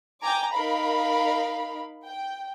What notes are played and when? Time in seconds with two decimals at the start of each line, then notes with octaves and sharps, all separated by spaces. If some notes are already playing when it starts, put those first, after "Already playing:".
0.21 G5 G#5 A#5 D6
0.53 D#4 A#4 F5 B5
2.06 G5